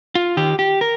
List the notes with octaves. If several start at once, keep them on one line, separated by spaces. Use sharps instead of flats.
F4
D#3 G4
G4
A#4